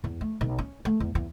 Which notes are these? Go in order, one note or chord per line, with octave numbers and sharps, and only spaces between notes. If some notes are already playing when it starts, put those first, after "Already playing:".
E2
A3
B1
C#4
A3
E2
E2